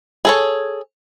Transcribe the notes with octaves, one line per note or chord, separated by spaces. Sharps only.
G#4 A4 C#5